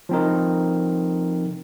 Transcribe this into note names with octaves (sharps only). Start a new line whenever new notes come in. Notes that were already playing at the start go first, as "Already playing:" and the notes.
F3 C4 D#4 A#4